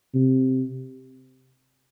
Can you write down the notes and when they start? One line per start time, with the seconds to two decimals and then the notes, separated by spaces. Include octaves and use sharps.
0.15 C3